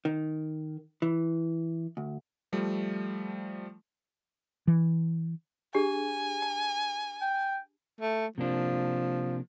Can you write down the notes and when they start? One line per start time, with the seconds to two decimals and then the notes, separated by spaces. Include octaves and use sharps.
0.05 D#3
1.02 E3
1.97 D2
2.53 F3 G3 A3
4.67 E3
5.75 D4 G4 G#4 G#5
6.42 A5
7.21 G5
8.01 A3
8.38 C3 F3 A#3 D4